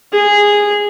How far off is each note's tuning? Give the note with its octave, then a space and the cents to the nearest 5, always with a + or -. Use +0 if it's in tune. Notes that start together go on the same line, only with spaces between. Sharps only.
G#4 -10